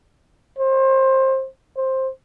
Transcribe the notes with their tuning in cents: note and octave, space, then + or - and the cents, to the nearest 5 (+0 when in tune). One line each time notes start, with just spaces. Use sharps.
C5 +25
C5 +10